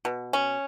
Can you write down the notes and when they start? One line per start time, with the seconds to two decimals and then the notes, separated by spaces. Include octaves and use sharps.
0.05 B2
0.33 C#4